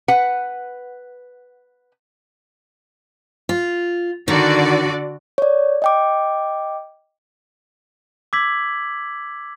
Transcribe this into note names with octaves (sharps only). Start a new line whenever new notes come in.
B4 F#5
F4
D3 D#3 F#4 D5
C#5 D5
D#5 G5 D6
D6 E6 G#6 B6 F#7